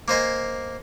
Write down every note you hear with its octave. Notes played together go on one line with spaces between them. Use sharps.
A#3 C5 D#5 G#5